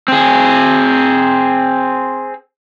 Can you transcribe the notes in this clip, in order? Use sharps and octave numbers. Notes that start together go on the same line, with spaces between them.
C4 G#4